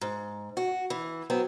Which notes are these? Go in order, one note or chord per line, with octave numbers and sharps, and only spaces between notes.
G#2
F#4
E3
F#3 B3 C4